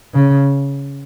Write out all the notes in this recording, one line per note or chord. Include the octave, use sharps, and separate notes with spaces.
C#3